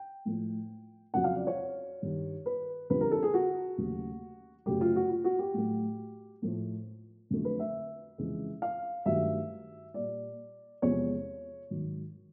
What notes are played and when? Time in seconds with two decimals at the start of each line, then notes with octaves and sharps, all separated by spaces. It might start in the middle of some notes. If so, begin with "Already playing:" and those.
Already playing: G5
0.25 A2 F3 A3
1.14 F2 C#3 F#3 F#5
1.24 F5
1.36 D5
1.47 C#5
2.02 G2 D#3 G3
2.46 B4
2.90 F2 D3 G3 B4
3.01 A#4
3.12 A4
3.23 G#4
3.34 F#4
3.78 D#2 C#3 F#3 A3
4.66 F#2 C#3 F#3 A3 G4
4.81 F4
4.96 F#4
5.10 F4
5.24 F#4
5.39 G4
5.54 A2 F#3 A3
6.42 A2 F3 A3
7.30 F2 D3 F#3 A3
7.45 B4
7.59 E5
8.18 F2 C#3 E3 G#3
8.62 F5
9.06 G2 D#3 F#3 A3 E5
9.94 A#2 G3 D5
10.82 E2 C3 F3 G#3 C#5
11.70 G#2 D#3 F#3